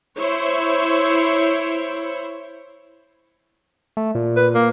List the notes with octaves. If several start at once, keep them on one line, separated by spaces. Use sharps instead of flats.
E4 C5 C#5
A3
A#2
B4
A#3